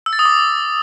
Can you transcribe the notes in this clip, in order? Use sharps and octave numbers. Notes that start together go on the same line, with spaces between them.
E6
A6
D#6
D6